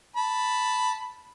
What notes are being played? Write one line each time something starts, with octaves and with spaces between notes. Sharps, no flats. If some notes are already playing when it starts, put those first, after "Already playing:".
A5 B5